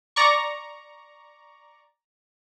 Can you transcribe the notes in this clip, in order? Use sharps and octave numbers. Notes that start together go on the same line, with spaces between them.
D5 A#5 C#6